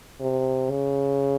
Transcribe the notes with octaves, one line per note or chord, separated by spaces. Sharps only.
C3
C#3